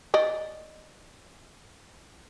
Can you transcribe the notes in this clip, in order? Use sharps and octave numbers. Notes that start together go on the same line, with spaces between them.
D5 D#5